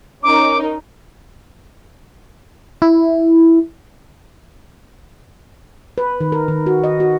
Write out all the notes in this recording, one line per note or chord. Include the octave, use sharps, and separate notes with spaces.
C#4 D#4 A#4 D6
E4
B4
D#3
A#4
D#3
F#4
D#5
F#4